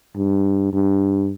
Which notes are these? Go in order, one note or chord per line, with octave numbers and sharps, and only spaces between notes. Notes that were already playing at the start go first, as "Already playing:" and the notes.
G2
G2